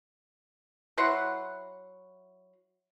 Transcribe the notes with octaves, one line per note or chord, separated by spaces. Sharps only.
F#3 E4 F#5 C6